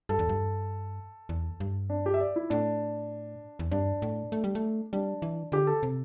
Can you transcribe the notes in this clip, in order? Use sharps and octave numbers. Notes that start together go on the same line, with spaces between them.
G2 A4
E2
G2
E2
G2
D4
G4
E5
D5
E4
A2 D4
E2
G2 D4
A2
A3
G3
A3
G3 D4
E3
D3 G4
A4
C3